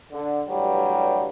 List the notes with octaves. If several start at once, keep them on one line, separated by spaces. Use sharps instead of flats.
D3
A1 G2 F#3 G3